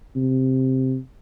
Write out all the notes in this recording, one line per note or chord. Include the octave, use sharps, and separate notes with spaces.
C3